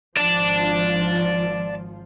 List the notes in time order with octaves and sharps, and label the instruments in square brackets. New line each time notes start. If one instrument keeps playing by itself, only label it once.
[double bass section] G#1 F3 [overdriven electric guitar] D5 A5